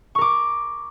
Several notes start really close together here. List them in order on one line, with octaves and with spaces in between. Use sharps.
C#6 A#4 D6